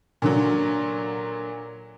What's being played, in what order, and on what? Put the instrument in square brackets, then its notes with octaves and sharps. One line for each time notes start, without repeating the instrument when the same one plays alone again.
[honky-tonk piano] A#2 D3 F#3